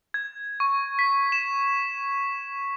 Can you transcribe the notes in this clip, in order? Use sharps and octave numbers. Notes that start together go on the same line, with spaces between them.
G#6
C#6
B6
E7